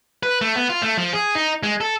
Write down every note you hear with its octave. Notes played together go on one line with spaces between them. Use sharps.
B4
A3
B3
F4
A3
F3
G#4
D#4
G#3
A4